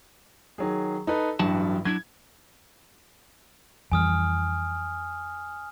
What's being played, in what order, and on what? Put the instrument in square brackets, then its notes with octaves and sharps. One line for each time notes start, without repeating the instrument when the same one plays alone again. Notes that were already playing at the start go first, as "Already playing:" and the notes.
[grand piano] D#3 F#3 G#4
D#4 A4 B4
[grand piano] A1 G2 [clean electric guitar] F#3 F#4 A5
[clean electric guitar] F#3 D4 E4 [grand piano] G#6
[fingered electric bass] F2 E3 G3 [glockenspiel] G#5 D#6 F6